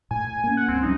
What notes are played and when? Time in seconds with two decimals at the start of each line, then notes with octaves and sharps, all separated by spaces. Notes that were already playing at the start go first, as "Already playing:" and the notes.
0.11 A2 G#5
0.44 A#3 C#4
0.57 F#5
0.68 C#2 G2 C4
0.83 F#3 G3 C#4 D#4